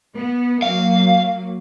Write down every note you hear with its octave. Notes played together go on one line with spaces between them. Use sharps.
B3
F#3 A#3 F5